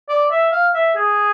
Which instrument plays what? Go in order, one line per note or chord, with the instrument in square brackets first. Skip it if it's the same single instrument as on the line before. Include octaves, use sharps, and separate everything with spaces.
[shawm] D5
E5
F5
E5
G#4